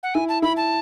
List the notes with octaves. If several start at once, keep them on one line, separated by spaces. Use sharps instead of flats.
F#5
E4 G#5
A5
E4 B5
A5